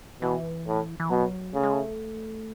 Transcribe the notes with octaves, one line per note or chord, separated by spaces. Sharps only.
B2 E3
A2
E3
B2 F#3
C#3 A3
G#3
A3